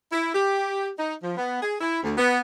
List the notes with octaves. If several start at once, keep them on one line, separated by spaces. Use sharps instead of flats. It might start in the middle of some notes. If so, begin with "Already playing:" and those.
E4
G4
D#4
F3
B3
G#4
E4
D2
B3